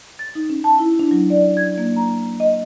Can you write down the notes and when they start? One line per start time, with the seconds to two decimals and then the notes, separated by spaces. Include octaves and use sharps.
0.19 A6
0.35 D#4
0.50 C#4
0.64 A5
0.79 E4
1.00 D4
1.11 F#3
1.30 D5
1.57 G#6
1.78 A#3
1.96 A#5
2.40 D#5